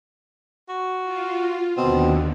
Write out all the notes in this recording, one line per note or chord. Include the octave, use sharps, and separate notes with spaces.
F#4
F4
D#2 B2 D3 C4